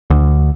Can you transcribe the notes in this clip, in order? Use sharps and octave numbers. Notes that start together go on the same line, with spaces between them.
D2